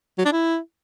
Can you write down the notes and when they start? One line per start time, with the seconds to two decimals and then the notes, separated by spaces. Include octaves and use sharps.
0.18 F#3
0.25 D4
0.32 E4